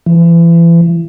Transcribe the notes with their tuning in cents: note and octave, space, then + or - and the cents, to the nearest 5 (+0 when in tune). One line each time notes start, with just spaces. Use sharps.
E3 +35